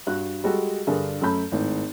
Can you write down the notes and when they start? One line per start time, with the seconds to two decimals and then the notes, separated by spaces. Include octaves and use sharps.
0.07 G2 F#4 F#6
0.44 G3 G#3 F#4 A4
0.87 G2 D3 G#4 A#4
1.21 F#2 A3 C#4 A5 B5 G6
1.52 G#1 A2